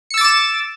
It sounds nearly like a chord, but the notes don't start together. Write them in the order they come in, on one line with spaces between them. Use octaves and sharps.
C#7 E6 A6 D6 E7